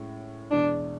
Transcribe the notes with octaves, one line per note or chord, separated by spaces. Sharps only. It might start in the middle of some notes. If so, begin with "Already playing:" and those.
Already playing: A2 G#3 C#4
E2 B2 G#3 D4